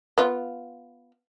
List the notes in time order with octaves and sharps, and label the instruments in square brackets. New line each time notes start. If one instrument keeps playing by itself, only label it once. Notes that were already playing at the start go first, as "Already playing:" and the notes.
[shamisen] B3 F4